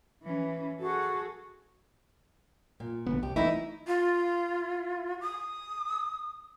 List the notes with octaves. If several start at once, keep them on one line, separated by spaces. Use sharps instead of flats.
E3 C#4
F#4 G#4 A4
A#2
A#1 D3 B3
C2 G4
E3 A3 D#4 E4
F4
D#6